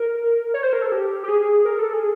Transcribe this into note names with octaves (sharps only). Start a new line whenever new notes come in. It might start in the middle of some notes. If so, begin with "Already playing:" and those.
Already playing: A#4
C#5
C5
A#4
A4
G4
G4
G#4
A#4
A4
G#4